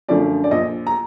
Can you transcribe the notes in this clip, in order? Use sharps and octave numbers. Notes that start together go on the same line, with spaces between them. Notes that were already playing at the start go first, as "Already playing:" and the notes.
F#2 D3 F3 A3 D5
D5
A#1 D#5
A#5